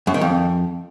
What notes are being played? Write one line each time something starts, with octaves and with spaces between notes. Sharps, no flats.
F#2
D#3
F2